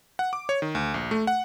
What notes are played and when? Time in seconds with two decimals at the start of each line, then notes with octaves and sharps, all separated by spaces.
0.19 F#5
0.33 D6
0.49 C#5
0.62 D#3
0.75 D2
0.94 A#1
1.11 A3
1.27 F#5